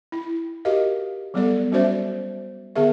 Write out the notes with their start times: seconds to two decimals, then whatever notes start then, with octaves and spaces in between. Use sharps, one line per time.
0.12 E4
0.65 F#4 G4 A#4 D#5 F5
1.34 F#3 G3 B3 A4 D5
1.72 G3 C#4 F#4 C5 D5 E5
2.76 D3 B3 G#4 A#4 E5